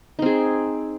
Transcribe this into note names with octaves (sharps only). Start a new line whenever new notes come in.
C4 D#4 G#4